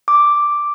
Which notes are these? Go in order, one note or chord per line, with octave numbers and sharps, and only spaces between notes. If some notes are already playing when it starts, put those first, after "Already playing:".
D6